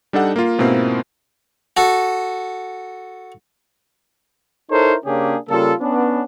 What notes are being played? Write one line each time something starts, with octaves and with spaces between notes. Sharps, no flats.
G3 D4 D#4 A4 F#5
A#3 F4
G#2 B2 A#3 C4 E4 F4
F#4 A4
D#4 E4 A4 A#4 C5 C#5
C#3 A#3 C#4 D4 G4 G#4
C#3 G3 A#3 F4 A4
B3 C#4 D4